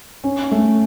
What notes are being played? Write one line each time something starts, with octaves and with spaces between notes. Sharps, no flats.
C#4
A3